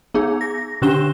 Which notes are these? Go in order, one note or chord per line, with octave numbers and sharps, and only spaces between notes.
B3 D#4 G#4
A#6
D3 C#4 D4 G4 E7 G7